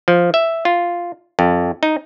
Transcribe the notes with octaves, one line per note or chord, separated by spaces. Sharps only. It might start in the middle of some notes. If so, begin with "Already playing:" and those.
F3
E5
F4
F2
D#4